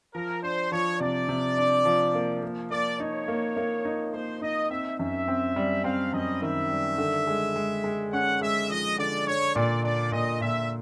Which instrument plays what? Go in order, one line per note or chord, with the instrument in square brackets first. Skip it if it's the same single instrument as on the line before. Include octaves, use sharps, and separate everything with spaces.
[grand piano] F3 [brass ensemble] A#4
[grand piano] D4 [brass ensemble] C5
[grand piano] F3 [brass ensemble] C#5
[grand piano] C3 [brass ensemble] D5
[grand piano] C3
D4
F3
A#3
A#3
[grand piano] A#3 [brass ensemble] D5
[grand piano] D#4 [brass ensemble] C#5
[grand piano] A#3
A#3
D#4
[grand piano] A#3 [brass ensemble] C5
[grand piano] D#4 [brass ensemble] D#5
[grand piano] C4 [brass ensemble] E5
[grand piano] F#2 [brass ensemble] E5
[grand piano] C4
G3
[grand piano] C4 [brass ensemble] F5
[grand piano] F#2 [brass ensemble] D#5
[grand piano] D#3 [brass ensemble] E5
[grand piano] G3
D3
G#3
G#3
G#3
[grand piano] C#4 [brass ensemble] F#5
[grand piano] G#3 [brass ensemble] E5
[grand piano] F3 [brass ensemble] D#5
[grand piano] D3 [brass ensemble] D5
[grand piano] D4 [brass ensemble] C#5
[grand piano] A#2 [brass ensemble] D5
[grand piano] D4 [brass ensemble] D5
[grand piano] A#2 [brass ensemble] D#5
[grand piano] A#2 [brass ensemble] E5